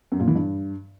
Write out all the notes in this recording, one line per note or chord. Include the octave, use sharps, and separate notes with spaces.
F#2
A#2
E3
G2